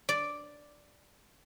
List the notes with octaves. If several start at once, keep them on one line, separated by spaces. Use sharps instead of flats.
D5